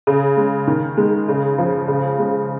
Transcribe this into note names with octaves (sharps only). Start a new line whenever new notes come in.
C#3
G#3
D#3
G#3
C#3
F3
C#3
G#3